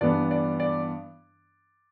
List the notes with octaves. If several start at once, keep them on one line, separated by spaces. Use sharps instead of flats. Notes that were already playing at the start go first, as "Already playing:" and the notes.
G2 E3 B3 D4 D5
D5
D5